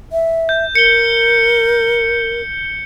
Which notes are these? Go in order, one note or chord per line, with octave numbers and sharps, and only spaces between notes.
E5
G6
A#4 C#7 G7